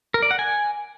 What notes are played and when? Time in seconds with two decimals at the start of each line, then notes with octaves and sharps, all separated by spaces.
0.14 A#4
0.22 D5
0.31 F#5
0.39 G#5